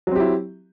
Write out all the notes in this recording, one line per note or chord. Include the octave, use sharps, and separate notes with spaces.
F#3 C4 E4 G4